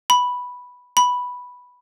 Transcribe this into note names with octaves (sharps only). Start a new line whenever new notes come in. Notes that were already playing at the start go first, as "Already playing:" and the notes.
B5
B5